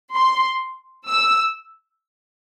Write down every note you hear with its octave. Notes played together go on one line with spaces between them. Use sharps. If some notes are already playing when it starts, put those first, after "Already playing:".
C6
E6